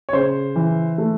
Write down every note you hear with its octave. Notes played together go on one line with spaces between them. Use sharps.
C#5
C#3 C5
E3
A3